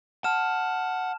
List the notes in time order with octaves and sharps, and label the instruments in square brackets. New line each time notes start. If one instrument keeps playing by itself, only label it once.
[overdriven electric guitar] F#5 [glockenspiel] A5 F6 E7